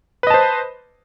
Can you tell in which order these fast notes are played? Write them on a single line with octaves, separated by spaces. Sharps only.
B4 D#5 A5 C5